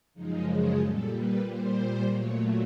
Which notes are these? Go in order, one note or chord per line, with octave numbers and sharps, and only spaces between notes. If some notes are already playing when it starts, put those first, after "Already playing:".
F#2 C#3 F3 G#3 D#4
G#4
A#2 G3 A4
B4
A#2 G3 C5
A#2 F#3 A3 C#5